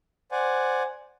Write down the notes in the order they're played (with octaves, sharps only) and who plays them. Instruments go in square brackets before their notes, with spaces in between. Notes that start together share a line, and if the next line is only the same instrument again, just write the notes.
[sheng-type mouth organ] C5 D5 F#5 G#5